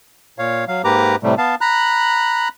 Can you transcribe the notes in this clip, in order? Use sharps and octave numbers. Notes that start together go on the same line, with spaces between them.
A#2 C#5 F5
F#3 F5
G#2 A#3 G4 B4 A#5 D6
A2 C3 G3 A3
B3 F5 A5
A#5 B5 F#6